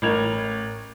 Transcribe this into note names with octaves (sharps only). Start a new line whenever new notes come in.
A1 A#4 G#6 F7